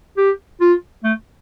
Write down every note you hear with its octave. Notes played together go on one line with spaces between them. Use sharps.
G4
F4
A3